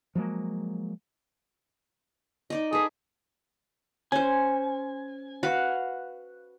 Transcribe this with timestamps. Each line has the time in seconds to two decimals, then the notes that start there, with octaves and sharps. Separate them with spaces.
0.15 F3 F#3 G#3 A#3
2.50 D#4 D5 D#5
2.73 G#4 A4 B4
4.12 C#4 C5 G#5
5.43 F#4 B4 F5